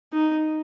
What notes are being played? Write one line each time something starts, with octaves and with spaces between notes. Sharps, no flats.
D#4